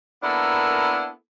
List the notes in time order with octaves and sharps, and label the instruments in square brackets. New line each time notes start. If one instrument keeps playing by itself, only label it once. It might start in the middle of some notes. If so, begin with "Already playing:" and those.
[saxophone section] A#3 B3 D4 E4 A4 A#4